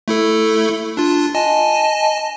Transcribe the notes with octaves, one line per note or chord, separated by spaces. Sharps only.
A3 E4 A4
D4 F4
D#5 G#5 A5